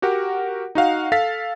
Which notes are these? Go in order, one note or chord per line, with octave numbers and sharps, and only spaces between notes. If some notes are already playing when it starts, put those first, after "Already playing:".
F#4 G4 A#4 F#5
D#4 F#4 F5 F#5
A4 F5 A6 B6